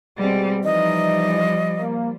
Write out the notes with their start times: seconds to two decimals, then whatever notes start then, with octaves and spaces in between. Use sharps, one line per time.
0.18 B2 G3 G#3 C4 G4
0.64 E3 F3 G3 D#4 D#5
1.79 A#3